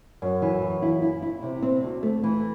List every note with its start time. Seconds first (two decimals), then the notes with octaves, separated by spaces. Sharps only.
0.22 F#2
0.42 E3
0.62 F#2
0.82 E4
1.02 E4
1.22 E4
1.43 C3
1.62 C4
1.83 D2
2.03 A3
2.23 E3